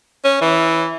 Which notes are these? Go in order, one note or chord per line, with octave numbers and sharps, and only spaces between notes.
C#4
E3